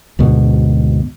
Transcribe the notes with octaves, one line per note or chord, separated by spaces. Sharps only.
D2 G#2 B2